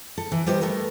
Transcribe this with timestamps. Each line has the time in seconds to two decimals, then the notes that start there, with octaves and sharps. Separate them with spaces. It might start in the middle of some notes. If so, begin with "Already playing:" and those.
0.18 A4
0.32 E3
0.46 G3 B3 G4 C5 D#5
0.61 A3 B3 A4 A#4